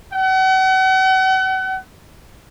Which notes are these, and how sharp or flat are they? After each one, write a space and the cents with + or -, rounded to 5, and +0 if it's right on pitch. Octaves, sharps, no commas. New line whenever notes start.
F#5 +40